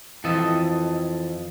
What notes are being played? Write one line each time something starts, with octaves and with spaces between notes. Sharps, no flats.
F2 E3 A4 D#5 A5